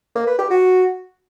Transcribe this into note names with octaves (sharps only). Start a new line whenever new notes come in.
A#3
B4
G4
F#4